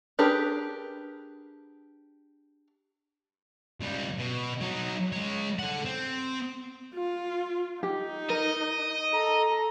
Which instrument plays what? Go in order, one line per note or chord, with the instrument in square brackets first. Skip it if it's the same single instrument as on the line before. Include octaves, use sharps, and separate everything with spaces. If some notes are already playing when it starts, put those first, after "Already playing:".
[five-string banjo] D4 G4 G#4 A#4 B4
[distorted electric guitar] C#2 G3
B2
F#3 D#4
G#3 C#5
A4 F#5
C4
[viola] F4
[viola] D#4 [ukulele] G4
[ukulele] A#4 [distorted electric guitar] D#5
[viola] A4 [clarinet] A#5